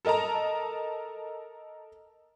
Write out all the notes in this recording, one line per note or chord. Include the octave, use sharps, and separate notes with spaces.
A4 A#4 D#5 A5 A#5